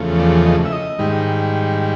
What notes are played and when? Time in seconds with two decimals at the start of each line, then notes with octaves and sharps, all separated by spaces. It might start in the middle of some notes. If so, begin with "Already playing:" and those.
Already playing: E2 C#3 F3 A3
0.19 D5
0.46 D#5
0.65 E5
0.72 D#5
0.99 G#2 D#3 G3